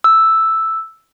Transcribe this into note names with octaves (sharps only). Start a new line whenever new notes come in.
E6